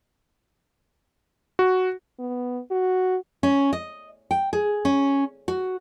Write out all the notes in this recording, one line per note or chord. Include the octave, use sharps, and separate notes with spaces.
F#4
B3
F#4
C#4
D#5
G5
G#4
C#4
F#4